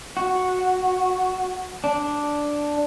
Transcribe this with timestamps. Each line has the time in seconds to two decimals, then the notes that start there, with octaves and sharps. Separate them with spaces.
0.17 F#4
1.84 D4